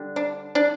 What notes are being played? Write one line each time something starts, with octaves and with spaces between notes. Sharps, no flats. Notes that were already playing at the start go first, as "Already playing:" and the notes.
Already playing: D3 G3
D4
D4